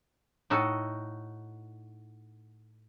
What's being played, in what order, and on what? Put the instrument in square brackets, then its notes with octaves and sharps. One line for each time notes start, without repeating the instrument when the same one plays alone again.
[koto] A2 D#4 F#4 A4